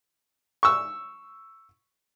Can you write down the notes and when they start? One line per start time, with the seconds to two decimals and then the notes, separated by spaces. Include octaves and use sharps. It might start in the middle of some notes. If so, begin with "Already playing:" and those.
0.63 C#6 E6